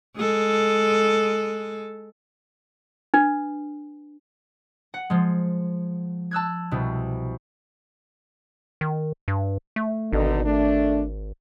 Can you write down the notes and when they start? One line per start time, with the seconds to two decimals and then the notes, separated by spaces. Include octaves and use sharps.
0.17 G#3 A4
3.14 D4 B4
4.94 F#5
5.10 F3 G#3
6.31 A5 E6 F#6 G#6
6.71 C2 B2
8.81 D#3
9.28 G2
9.76 A3
10.13 G#1 B2 D3 D#4
10.45 A3 D4